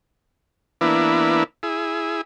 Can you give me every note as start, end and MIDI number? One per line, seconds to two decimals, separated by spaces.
0.81 1.44 52
0.81 1.44 58
0.81 1.44 59
0.81 1.44 62
0.81 1.44 64
1.63 2.21 64
1.63 2.21 68